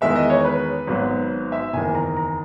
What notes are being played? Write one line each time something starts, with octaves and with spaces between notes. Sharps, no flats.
E2 D#3 G#3 B3 E5
D#5
C#5
B4
G#1 G#2 F#3 B3
E5
F#1 E2 D#3 G#5
A#5
A#5